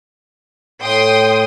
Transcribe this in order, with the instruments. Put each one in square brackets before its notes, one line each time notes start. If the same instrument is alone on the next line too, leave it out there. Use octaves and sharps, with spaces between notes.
[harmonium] A2 [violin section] G5 C6 D#6